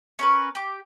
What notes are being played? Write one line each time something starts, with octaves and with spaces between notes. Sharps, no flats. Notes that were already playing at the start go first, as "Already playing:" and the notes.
C#4 A#4 B4
G4 D6